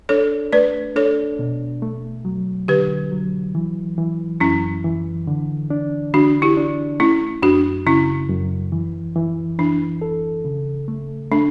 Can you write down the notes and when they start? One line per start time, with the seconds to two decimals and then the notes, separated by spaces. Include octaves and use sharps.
0.09 D4 A4 C#5
0.53 A3 B4 D5
0.96 D4 A4 C#5
1.39 B2
1.82 A3
2.25 F#3
2.68 D3 G4 B4
3.11 F#3
3.55 E3
3.98 E3
4.40 F#2 C#4 E4
4.84 E3
5.27 D3
5.70 D4
6.14 D3 D4 F#4
6.42 E4 G4
6.57 D4
7.00 A3 C#4 E4
7.42 F#2 D4 F#4
7.86 C#3 C#4 E4
8.30 F#2
8.72 E3
9.16 E3
9.59 E3 D4
10.02 A4
10.45 C#3
10.88 A3
11.31 A3 D4